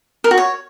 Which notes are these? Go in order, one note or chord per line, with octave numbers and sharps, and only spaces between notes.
A#4
F#4
C#5